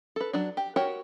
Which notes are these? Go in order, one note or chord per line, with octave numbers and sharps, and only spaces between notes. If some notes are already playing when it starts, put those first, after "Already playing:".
A4 B4
F#3 D4
G4
F#4 G4 A#4 C#5